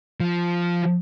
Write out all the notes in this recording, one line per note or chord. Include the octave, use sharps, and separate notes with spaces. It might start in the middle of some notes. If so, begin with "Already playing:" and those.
F3